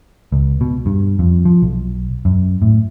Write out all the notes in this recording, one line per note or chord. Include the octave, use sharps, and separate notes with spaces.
C#2
B2
G2
F2
F3
B1
F#2
A2